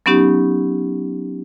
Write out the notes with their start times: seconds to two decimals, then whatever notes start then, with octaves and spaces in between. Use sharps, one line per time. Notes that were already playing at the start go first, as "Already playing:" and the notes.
0.06 F#3 B3 C#4 D#4 G4